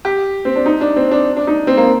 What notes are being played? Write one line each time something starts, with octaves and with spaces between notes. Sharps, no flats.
G4
C4
D4
D#4
D4
C4
D4
D4
D#4
C4
A#3